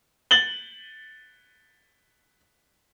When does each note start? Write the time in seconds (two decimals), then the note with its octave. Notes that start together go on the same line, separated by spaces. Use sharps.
0.31 A6 F#7 G7